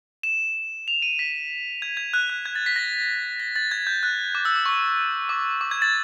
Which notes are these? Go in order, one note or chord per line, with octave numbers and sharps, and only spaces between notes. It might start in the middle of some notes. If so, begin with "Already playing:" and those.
E7
F7
D#7
B6
G#6
G#6
F#6
F#6
G#6
A6
B6
A#6
A#6
A6
G#6
G6
F#6
D6
E6
D6
C#6
D6
D6
G#6
A6